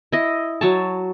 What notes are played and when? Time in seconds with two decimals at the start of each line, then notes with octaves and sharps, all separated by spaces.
0.12 E4 D#5
0.61 F#3 C#5 A5